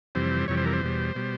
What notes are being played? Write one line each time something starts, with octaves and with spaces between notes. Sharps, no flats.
F2 C3 E3 G3 C5
F2 C3 E3 G3 C#5
C5
A#4
C5
E2 B2 G3
B2 G3